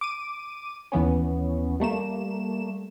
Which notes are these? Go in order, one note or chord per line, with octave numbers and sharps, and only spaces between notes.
D6 D#7
D#2 E3 B3 C#4
G3 A3 A#3 E7